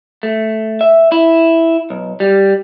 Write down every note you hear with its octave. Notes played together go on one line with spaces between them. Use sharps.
A3
E5
E4
B1
G3